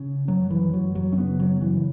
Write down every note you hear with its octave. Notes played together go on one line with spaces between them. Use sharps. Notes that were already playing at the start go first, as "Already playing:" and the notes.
Already playing: C#3
F#2 F#3
E3
F#2 F#3
F#3
C#4
C#3 B3
F#3
C#3 E3